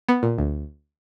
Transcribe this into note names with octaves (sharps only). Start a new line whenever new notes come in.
B3
A#2
D2